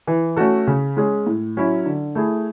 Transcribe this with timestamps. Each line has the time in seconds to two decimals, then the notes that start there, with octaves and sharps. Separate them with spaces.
0.07 E3
0.36 A3 C#4 F#4 A4
0.67 C#3
0.97 G#3 C#4 G#4
1.27 A2
1.57 F#3 C#4 E4
1.86 D3
2.15 A3 E4 G#4